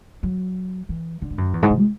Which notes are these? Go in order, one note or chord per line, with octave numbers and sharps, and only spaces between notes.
F#3
E3
D3
G#2
F#2
E2
G#2
B2
G#3